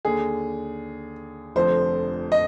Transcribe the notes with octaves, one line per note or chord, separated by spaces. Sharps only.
D#2 D3 G#4
F1 F2 D3 C5
D#5